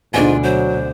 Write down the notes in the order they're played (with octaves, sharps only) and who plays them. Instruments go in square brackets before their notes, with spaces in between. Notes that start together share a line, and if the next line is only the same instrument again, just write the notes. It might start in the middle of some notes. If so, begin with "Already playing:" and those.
[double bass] D2 B2 [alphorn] G#2 [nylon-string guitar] D4 D5 G#5 [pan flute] F4
[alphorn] F#3 [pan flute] C5